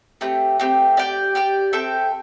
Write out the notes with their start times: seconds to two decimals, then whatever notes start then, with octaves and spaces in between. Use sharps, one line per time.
0.21 A3 C4 G4
0.59 A3 C4 G4
0.97 G4 D5 G5
1.35 G4 D5 G5
1.73 C4 A4 E5 G5